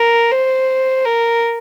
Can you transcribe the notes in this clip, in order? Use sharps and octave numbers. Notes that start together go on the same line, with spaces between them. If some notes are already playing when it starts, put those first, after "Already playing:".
Already playing: A#4
C5
A#4